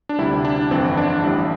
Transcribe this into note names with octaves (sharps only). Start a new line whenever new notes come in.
D4
D2 C3 G3 E4
D4
G1 F2 E3 C4
D4
A1 A2 G3 E4